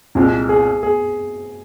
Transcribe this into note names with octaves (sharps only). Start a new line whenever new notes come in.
C2 A#2 G#3 C4
G#4
G#4